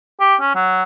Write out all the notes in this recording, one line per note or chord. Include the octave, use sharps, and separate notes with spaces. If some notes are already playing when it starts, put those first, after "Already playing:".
G4
C#4
F#3